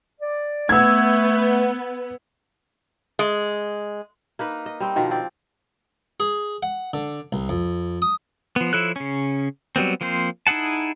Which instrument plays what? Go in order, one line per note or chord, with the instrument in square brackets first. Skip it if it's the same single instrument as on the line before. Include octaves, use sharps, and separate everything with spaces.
[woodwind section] D5
[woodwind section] A3 [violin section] B3 [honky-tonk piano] E6 G#6
[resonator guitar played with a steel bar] G#3
[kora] A#3 D#4 B4
D#5
G3 C4
B2 D#3 F3
C4 D5
[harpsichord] G#4
F#5
D3
C2
F2
D#6
[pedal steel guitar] F3 B3
F3 E4 A4 C#5 F#6
C#3 C#4
F#3 G3 B3 C4
F3 A#3 C4 C5
D#4 E4 G#4 F#5 A5